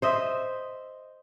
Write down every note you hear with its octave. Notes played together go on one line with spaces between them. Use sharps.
C5 D#5 E5